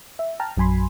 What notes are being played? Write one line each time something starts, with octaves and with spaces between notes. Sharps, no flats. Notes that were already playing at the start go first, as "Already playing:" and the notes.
E5
G5 A5 A#5 F6
A#1 F#2 F#3 G#5 B5 C6